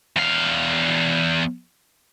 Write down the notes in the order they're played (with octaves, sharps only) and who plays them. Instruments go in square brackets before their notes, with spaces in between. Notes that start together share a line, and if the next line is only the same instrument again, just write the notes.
[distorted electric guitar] E2 F5